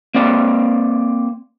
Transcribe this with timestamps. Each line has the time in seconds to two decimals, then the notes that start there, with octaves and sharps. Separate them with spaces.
0.15 A#3 C4 D5